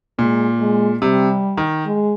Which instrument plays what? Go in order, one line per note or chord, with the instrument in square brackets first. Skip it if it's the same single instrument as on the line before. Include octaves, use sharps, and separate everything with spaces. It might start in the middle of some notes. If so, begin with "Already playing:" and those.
[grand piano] A#2 [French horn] G#3
[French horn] G#3
[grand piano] C3 [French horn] G3
[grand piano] D#3
[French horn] G#3